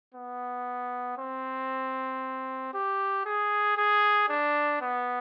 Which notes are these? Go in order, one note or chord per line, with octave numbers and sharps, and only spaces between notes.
B3
C4
G4
G#4
G#4
D4
B3